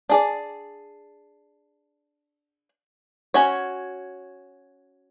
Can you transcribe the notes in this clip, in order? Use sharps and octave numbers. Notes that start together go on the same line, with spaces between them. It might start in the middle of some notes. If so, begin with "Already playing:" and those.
D4 G#4 D5
C#4 F#4 C#5